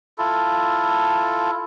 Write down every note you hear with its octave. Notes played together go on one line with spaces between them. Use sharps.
E4 F4 A4